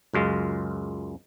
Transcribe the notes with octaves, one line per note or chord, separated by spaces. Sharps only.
C#2 F#2 G#3 F4